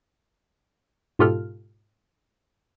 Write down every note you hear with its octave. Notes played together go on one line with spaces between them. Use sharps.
G#2 B2 F4 G4 A4 F6